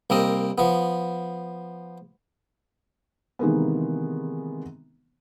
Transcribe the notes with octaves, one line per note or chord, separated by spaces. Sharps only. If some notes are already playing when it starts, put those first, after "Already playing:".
C2 A#3 C4 D#5
F3 B3
C3 D#3 E3 G#3 A#3 B3